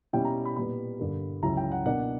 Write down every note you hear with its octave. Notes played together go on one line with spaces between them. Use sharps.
B2 G3 C#4 E4 G5
A#5
B5
A#2 G3 B3 B5
G2 D3 A#3
C#2 C#3 F#3 C#4 E4 A#5
G5
F#5
B2 A#3 D4 F#5